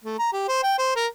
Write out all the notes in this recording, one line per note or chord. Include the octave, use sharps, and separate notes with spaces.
A3
A#5
G4
C5
G5
C5
A#4